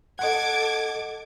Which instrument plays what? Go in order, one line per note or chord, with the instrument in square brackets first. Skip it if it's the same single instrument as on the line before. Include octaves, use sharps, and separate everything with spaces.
[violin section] A4 D6 G#6 [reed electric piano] D#5 F#5